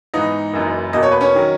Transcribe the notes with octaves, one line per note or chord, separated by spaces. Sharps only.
G#2 E3 B3 D#4 D#5
F#1 F#2 E3
E2 B2 A#3 D#5
C#5
B4
C#4 C#5
D#3 F#3